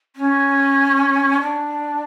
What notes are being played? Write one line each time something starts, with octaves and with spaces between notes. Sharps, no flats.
C#4
D4